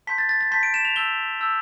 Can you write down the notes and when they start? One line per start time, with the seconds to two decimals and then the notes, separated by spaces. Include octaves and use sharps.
0.07 A5 C6 G6 B6
0.18 A6
0.29 A6
0.41 A6
0.51 A5 C6 G6 B6
0.63 D7
0.74 E7
0.85 F7
0.96 A5 E6 G6 G7
1.41 A5 E6 G6